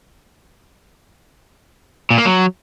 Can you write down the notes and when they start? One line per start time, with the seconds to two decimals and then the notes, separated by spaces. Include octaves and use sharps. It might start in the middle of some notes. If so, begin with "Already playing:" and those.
2.10 A#2
2.18 A#3
2.25 F#3